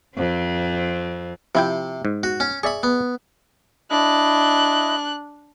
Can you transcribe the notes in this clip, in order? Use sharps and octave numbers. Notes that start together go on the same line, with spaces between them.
F2 C4
C3 F3 E4 G5
G#2
F#4
C#4
G#4 D5 E5 B5 C#6
B3
D4 E4 D#5 F#6